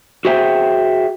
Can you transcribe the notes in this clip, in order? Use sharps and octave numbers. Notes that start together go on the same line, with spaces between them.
F#4 G#4 C5 E5 G5